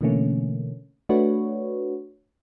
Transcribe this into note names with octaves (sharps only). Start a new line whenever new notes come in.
B2 D3 E3 A3 A#3 C#4
A3 D4 F#4 B4 C#5